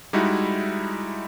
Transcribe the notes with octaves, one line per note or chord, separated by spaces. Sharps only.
G3 G#3 D#4 E4 F#4